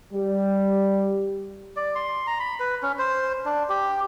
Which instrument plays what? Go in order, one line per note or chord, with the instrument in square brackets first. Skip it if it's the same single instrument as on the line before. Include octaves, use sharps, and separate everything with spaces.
[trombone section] G3
[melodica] D5
C6
A#5
B5
B4
C#4
C5
D4
G4